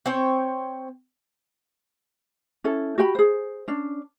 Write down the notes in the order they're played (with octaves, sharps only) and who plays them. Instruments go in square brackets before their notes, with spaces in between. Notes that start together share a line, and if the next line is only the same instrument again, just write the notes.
[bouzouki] C4 C5 C#5 G5
[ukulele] C#4 E4 A4
F#4 G4 G5 B5
G#4 C5
C#4 D4